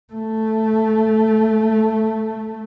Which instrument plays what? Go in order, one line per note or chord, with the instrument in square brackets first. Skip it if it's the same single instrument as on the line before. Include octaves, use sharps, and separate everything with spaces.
[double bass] A3